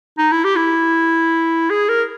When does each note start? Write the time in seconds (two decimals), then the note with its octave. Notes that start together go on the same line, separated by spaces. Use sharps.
0.18 D#4
0.32 E4
0.44 G4
0.56 E4
1.70 G#4
1.89 A#4